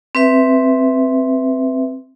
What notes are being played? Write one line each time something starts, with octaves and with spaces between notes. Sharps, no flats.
C4 B4 E5